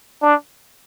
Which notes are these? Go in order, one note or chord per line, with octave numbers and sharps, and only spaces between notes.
D4